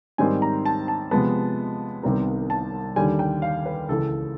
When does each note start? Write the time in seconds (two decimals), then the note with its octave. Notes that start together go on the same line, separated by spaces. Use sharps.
0.18 G#2 D#3 G3 C4 G#5
0.42 A#5
0.66 A5
0.88 A5
1.11 C3 F3 G#3 B3 A5
2.03 C2 C3 D#3 G3 B3 A#5
2.50 A5
2.96 D#2 D3 G3 G#5
3.19 G5
3.42 F5
3.66 B4
3.89 C#2 C#3 E3 A4